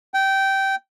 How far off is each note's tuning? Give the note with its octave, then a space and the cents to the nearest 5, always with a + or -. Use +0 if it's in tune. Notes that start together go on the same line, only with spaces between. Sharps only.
G5 -15